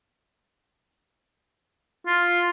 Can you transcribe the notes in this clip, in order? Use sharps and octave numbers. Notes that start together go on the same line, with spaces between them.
F4